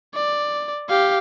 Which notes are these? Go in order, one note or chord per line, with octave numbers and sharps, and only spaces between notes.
D5
G4 F5